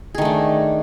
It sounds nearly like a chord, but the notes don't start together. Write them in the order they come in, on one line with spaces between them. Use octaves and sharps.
G#4 D#3 A3 D4